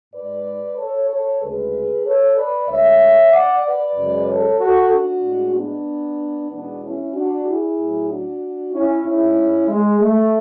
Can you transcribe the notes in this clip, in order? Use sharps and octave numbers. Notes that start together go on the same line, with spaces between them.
G#2 G#3 B4 D5
A4 C#5
A4 C#5
D2 C#3 G#3 G#4 B4
A4 C#5
B4 D5
D2 D3 G#3 C#5 E5
D5 F#5
B4 D5
F#2 C#3 G#3
A4 C#5
F#4 A4
D4 F#4
A2 G#3
B3 D4
E2 B2 G#3 B3 D4
C#4 E4
D4 F#4
E4 G#4
A2 F#3
D4 F#4
C#4 E4
G#2 G#3 C#4 E4
G#3
A3